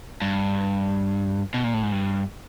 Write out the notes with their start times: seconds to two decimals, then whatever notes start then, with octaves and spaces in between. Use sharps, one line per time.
0.22 G2
1.54 B2
1.64 A#2
1.74 A2
1.83 G#2
1.92 G2